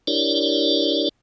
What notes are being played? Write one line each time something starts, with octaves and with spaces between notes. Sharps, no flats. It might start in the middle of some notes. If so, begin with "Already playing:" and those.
D4 E4 G4 A#4 C#5 D5